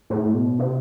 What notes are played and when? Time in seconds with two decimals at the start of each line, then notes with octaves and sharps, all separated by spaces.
0.10 A2
0.34 B2
0.59 C3